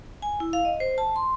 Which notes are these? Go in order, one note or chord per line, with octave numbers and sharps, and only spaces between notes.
G#5
E4
F5
D#5
C5
A5
C6